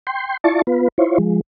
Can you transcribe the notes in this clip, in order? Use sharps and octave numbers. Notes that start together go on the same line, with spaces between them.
G5 C6
E4 F4 D5 A5 C#6
B3 F4 B4
E4 F4 C5 C#5
F3 G#3